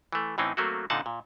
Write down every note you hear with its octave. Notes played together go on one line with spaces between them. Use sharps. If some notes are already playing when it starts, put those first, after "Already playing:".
E3 A3
A2 E3 C4 C#4 D#4
F#3 A3 A#3 C4 F#4
A#2 D3 C4 D#4 F#5 A5
A#2